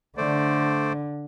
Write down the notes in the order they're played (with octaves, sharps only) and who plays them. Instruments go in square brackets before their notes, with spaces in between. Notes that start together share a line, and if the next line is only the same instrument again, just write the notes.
[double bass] D3 [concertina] A3 C5 D5